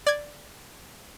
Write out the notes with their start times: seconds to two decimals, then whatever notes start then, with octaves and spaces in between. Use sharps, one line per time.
0.07 D5 G#6